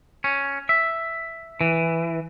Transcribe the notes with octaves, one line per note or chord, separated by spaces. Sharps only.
C#4
E5
E3